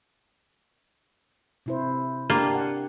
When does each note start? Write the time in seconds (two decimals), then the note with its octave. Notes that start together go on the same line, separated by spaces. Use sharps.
1.66 C3 E4 C5
2.30 A#3 D4 F4 G4
2.55 F#5